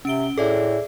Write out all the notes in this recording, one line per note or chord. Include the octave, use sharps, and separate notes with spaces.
C3 C#4 D7 G7
A2 G#4 A4 D5 E5